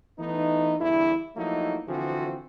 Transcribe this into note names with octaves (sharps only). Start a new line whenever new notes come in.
E3 A3 B3 D#4
E2 G2 D3 E4
F3 F#3 A3 A#3 D#4 E4
D3 E3 F3 C4 F4 F#4